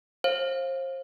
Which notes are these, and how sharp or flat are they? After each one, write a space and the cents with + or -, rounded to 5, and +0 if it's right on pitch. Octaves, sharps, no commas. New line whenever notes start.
C5 +35 F5 +0